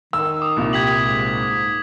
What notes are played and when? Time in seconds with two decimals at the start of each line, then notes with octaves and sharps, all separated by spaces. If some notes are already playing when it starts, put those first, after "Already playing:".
0.13 D#3 E6
0.42 D6 D#6
0.56 C2 A#2
0.73 G4 G#6 B6 F#7
0.98 G#2